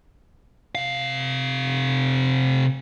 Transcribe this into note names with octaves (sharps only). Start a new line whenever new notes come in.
C3 F5